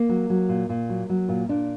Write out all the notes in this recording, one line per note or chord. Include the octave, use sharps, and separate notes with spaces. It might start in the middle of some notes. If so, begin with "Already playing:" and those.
Already playing: A#3
F#3
F#3
A#2
A#2
F#3
F#3
A#2
A#2 D4